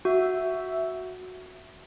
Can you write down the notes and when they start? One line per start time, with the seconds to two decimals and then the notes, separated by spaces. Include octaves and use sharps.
0.05 F#4 E5